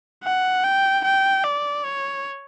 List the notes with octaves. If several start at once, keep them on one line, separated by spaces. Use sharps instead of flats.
F#5
G5
G5
D5
C#5